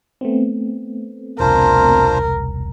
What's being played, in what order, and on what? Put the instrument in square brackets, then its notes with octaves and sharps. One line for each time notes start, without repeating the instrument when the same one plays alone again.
[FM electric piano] A3 B3 C4
[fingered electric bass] E1 C2 [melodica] D4 F4 C5 [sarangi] A#4